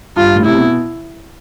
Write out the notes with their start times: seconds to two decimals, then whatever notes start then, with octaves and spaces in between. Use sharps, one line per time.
0.16 G2 F4
0.36 A2
0.45 C3 E4
0.55 B2